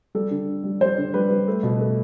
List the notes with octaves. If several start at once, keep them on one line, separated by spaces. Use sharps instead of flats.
G3 A4
D3
D3
G3
G3 C5
D3
G3 B4
G3
A3
B2
A3